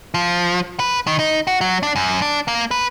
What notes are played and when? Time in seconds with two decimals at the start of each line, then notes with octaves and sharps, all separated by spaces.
0.14 F3
0.80 B4
1.07 D#3
1.19 D#4
1.47 F#4
1.61 F#3
1.83 D4
1.96 F#2
2.22 D4
2.48 A#3
2.71 B4